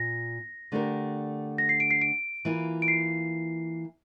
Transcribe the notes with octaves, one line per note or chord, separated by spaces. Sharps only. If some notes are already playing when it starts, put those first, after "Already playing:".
Already playing: A#2 A#6
D3 A3 D4 G4 A#4
A#6
C7
D7
C7
D7
E3 A#3 F4
D7
C7